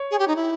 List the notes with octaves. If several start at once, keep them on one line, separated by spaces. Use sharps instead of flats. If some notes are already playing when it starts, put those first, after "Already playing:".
Already playing: C#5
G#4
G4
D#4
E4